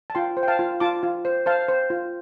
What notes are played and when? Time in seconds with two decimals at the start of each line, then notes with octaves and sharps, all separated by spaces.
0.10 A5
0.15 F4 G5 C6
0.37 C5
0.43 G5
0.48 F5 A5
0.59 F4
0.80 F4 A5 D6
1.03 F4
1.25 C5
1.46 C5 F5 A5
1.69 C5
1.90 F4